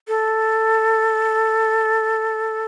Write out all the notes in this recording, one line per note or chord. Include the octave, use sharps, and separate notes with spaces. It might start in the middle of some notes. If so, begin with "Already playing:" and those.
A4